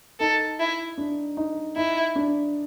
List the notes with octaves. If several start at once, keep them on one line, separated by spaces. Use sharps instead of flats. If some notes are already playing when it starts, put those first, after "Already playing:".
D#4 A4
E4
D4
D#4
D#4 E4
D4